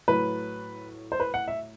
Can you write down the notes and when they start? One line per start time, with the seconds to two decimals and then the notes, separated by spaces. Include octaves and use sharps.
0.08 A2 F#3 B4
1.12 C5
1.20 B4
1.34 F#5
1.48 E5